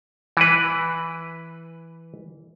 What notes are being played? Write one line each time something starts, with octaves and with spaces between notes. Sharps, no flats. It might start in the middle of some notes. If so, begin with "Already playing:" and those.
E3 B4